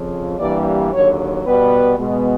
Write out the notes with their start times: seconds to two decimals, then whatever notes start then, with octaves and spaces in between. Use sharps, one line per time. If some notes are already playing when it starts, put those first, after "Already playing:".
Already playing: F2 C#3 F3
0.37 G2 E3 G3 A#3 D5
0.91 D#2 D3 F#3 C#5
1.45 B2 G3 B3 B4
1.99 B2 G#3 B3